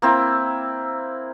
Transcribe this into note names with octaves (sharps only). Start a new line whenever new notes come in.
A#3 C4 E4